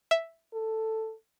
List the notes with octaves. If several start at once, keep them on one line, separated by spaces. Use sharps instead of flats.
E5
A4